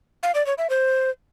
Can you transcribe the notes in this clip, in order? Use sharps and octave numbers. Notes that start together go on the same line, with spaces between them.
F5
D5
C#5
E5
C5